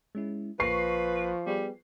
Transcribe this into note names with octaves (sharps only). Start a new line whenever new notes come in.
G#3 C#4 E4
A#1 F3 A#3 B4 C#6 A#6 C7
G3 B3 G#4 B4